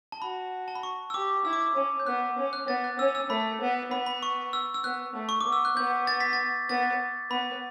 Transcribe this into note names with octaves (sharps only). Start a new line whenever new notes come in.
A5
F#4 B5
A5
B5
C#6
E6
G4 D6
E4 E6
D6
E6
C#4
G6
B3 F#6
C#4
F#6
B3 A6
F#6
C#4 E6
E6
A3 B5
B3
B3 B5
B5
C#6
E6
E6
B3 F#6
A3
C#6
D6
B3
E6
F#6
B3 G6
A6
B6
A6
B3 A6
B3 B5